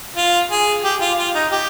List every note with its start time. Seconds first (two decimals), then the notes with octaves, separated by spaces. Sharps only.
0.16 F4
0.50 G#4
0.84 G4
1.01 F4
1.18 F4
1.35 D#4
1.52 G4